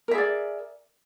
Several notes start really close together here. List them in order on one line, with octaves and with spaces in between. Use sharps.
A#4 E5 G#4 D5